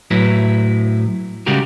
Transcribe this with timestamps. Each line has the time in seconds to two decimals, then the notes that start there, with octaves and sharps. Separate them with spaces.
0.11 A2 F#3 E4 B4
1.46 C#3 G3 G#3 F#4 G4 A#4